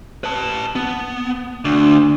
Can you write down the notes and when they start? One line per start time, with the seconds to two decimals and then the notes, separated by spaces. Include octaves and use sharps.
0.24 B4 A5
0.76 B3
1.65 D2 D4